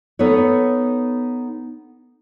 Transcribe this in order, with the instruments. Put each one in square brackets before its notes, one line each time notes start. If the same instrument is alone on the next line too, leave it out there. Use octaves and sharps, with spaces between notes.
[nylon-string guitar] B3 D#4 A4 B4 C#5